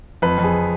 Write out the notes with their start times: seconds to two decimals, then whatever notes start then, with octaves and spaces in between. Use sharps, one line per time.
0.22 F2 B4
0.38 F2
0.44 G#4